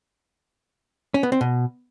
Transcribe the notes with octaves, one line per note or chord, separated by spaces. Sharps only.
C#4
B3
C4
B2